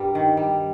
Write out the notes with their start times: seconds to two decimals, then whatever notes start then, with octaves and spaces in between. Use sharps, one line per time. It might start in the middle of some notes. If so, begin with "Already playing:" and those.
Already playing: G2 G3 A#4
0.15 D#3
0.37 G3